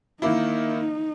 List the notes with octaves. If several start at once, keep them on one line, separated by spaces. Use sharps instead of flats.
D#3 A#3 D#4 E4